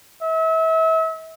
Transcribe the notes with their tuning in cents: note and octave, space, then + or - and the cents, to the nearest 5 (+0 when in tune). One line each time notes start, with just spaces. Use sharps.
E5 -35